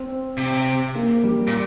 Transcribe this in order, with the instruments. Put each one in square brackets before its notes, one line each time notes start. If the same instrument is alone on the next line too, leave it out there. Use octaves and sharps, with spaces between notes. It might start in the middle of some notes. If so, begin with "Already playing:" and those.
Already playing: [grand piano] C4
[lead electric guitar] C3
[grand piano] A#3
G3
[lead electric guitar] A#2